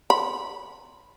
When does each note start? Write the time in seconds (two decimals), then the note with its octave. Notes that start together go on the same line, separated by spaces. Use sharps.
0.10 B5